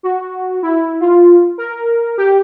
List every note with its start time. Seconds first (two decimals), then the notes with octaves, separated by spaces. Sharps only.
0.03 F#4
0.63 E4
1.01 F4
1.58 A#4
2.18 G4